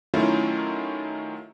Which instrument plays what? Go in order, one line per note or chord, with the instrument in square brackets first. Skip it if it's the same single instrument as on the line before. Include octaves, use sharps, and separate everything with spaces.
[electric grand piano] D#3 F#3 A3 C#4 E4 F4